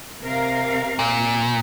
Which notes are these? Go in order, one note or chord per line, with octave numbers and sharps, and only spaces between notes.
C3 A#4 F5
A#2